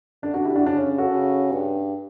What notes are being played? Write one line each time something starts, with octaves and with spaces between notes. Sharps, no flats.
D3 D4
D4 F#4
E4 G4
D4 F#4
C#3 D4
C#4
F#4 A4
C#3
G2